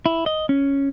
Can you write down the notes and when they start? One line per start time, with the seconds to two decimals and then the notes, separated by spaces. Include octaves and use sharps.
0.06 E4
0.26 D#5
0.49 C#4